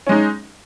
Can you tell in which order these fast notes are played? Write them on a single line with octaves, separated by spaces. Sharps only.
C#4 G#3 D#4